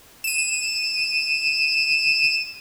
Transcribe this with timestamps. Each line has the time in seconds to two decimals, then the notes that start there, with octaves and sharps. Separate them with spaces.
0.24 D#7 E7